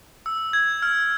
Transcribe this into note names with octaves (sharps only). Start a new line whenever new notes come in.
E6
G#6
F6